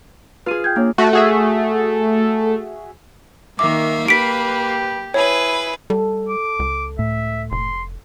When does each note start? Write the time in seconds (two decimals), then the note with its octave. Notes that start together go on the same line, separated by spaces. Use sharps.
0.46 F4 G#4 B4 D#7
0.64 G5 G6 G#6
0.76 A#3 D4 C#5
0.98 A3 F#4
1.13 F#4 G#4 E5
3.59 D#3 A#3 E5 F5 D6
4.08 G4 B4 B6 D7
5.14 E4 G#4 B4 C#5
5.90 G3 A4
6.29 D6
6.59 C#2
6.99 A2 E5
7.52 F1 C6